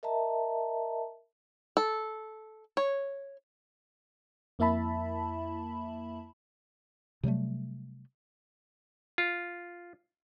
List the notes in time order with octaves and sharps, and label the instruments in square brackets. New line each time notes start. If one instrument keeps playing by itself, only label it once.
[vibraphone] A#4 D#5 E5 A5 A#5
[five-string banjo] A4
C#5
[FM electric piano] F2 A#3 E4 E5 A5 B5
[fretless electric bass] C3 F#3 G3 A3
[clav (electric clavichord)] F4